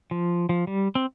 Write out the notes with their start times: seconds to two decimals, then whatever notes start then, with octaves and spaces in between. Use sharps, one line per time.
0.11 F3
0.49 F3
0.67 G3
0.95 C4